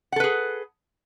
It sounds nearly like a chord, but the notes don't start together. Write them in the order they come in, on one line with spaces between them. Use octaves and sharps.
F#5 A4 B4 G#4